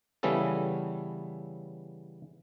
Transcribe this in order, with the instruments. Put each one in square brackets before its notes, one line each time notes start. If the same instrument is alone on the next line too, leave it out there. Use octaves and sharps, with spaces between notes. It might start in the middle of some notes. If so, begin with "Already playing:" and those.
[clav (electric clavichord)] C#3 E3 G3 B3 C#4 A4